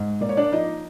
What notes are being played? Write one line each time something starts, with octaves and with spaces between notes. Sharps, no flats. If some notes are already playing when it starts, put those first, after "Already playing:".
Already playing: G#2
A#3 D5
C#5
D4 D5
F3 D#4 D#5